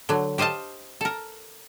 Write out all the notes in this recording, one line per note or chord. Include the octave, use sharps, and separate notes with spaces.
D3 F#3
G4 C5 D#5 F5 A5
A4 A#4